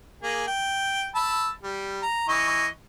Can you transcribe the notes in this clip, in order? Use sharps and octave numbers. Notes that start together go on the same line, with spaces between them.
A#3 G#4
G5
A5 B5 E6
G3
A#5
E3 D#5 C#6